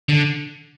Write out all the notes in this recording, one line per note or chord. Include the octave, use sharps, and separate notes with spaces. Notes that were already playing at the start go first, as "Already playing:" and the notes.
D3